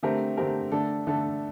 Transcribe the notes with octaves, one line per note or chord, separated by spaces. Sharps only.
D3 A3 C4 G4 A#4
D3 A3 C4 G4 A#4
D3 A3 D4 A4
D3 A3 D4 A4